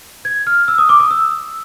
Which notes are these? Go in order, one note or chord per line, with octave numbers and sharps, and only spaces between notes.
G#6
F6
E6
D#6
D6
D#6
E6